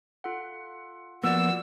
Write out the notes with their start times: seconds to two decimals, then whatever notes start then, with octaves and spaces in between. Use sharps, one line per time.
0.24 F4 A4 F#5
1.24 F3 A#3 B3 F#4 D5 F#5 E6